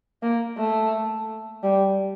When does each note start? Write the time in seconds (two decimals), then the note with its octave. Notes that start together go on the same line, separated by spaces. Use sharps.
0.22 A#3
0.57 A3
1.63 G3